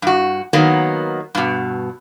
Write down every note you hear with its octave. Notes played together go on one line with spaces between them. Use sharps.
G2 F#4
D#3 F#3 A#3 B3
G2 B2